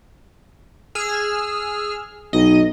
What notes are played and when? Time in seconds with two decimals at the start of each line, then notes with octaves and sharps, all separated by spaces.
0.95 G#4 E6 F6
2.33 B1 D#5